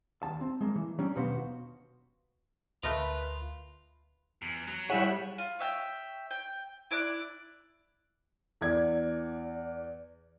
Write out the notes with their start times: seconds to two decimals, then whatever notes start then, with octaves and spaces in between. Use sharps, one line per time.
0.23 D#2 A5
0.41 C4
0.61 G#3 A#3
0.76 E3
0.99 F#3 G3 C#4 D4 G4
1.16 D#2 B2 B3 F#4 C5 F5
2.83 D2 A3 F4 A#4 B4 D#5
4.42 E2
4.67 F#3
4.90 G3 E4 G#4 C#5 E5 F#5
5.38 F4
5.59 C#5 E5 F#5 G5
6.31 G5
6.91 E4 D5 D6 F#6
8.61 E2 D5 G#6